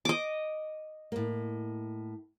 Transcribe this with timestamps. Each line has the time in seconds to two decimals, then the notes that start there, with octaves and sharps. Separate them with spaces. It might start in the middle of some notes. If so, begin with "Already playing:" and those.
0.05 D#5 D6
1.12 A2 A#3